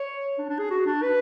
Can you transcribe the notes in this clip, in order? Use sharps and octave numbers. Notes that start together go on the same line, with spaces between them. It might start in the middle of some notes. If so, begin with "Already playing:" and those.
Already playing: C#5
D4
D4
G#4
F#4
D4
B4